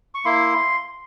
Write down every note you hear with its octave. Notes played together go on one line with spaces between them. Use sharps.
C#6
A#3 E4 C6